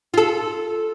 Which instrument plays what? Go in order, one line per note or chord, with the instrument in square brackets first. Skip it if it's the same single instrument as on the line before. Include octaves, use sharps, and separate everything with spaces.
[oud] F4 A4